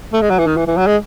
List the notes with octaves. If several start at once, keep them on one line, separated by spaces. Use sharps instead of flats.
A3
G#3
F#3
E3
D#3
E3
E3
F#3
G#3